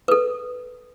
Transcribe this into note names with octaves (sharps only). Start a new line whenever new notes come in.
A4 B4